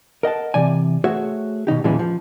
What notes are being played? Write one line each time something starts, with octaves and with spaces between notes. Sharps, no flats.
A#4 D#5 F#5 A5
C3 E3 D5 G#5
A3 F#4 G#4 C5 C#5 E5
B2 D#3 D#4 G4
D#2 A#2 E3 F3 G#3 C#4
F3